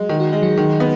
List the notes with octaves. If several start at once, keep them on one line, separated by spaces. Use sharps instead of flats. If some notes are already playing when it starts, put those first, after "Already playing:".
Already playing: F#3 G#3 F#4
D#3 G#4
F#4
G#3 D#4
F#3 F#4
D#3
B3